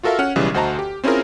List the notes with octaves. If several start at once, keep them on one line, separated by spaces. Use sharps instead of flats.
F4 F#4 A4 A#4 E5 F5
C#4 F#5 F6
B1 C#3 E3 G3
D2 F#4 C5 D#5 A5 A#5
G4
C4 C#4 E4 F4 G#4 A#4